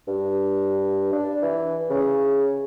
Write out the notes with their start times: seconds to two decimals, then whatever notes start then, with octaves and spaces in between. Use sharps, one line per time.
0.07 G2
1.12 D4
1.42 E3
1.90 C#3